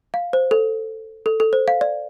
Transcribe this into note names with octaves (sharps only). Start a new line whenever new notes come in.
F5
C5
A4
A4
A4
C5
F5
D5